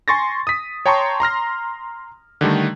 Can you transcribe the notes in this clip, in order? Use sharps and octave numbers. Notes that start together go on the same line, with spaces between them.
G#5 C6 C#6 A6 A#6
D#6 B6
C#5 G5 A5 A#5 C6 C#6
A#5 C6 F6 A#6
D3 D#3 G3 A3